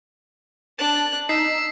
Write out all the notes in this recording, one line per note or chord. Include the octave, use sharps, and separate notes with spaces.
D4 A5 F#6
D#4 E6 B6 C7